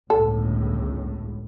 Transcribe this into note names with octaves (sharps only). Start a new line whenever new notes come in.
G1 C#2 A2 A4